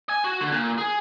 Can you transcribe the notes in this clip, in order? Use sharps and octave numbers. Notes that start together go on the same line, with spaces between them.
G#5
F#4
D3
A#2
G#4